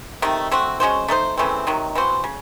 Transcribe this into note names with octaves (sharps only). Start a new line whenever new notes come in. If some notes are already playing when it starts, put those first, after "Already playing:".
C3 D#3 A3
A3 C4 F#4
G#3 C#4 F#4 C5
A3 D#4 A4 C5
C#3 E3 A3 C4
C3 D#3 F#3
E3 C4 F#4 C5
C#3